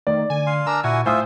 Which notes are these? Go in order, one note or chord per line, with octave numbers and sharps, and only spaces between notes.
D#3 A3 D5
D3 G#5
F5 C6
D4 A#4 G#5 A#5 E6
A#2 E4 F#4 F#5 G#5
A2 F4 C5 E5 G#5 D#6